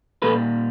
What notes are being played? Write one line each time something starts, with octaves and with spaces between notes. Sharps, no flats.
A#2 G3 A4 B4